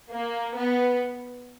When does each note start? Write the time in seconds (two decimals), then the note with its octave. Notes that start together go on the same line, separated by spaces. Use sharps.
0.10 A#3
0.55 B3